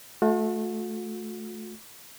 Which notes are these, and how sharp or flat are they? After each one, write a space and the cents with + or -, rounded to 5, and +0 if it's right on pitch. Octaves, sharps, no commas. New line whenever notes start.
A3 -15 F#4 -45